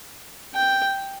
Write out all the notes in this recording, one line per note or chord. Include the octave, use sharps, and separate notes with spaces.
G5